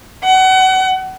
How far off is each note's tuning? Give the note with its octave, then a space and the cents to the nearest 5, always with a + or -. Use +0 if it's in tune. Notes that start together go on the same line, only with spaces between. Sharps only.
F#5 +30